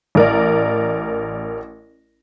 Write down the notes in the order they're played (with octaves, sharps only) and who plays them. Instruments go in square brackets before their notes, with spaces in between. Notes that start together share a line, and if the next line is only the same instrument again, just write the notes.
[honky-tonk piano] A1 A#4 D5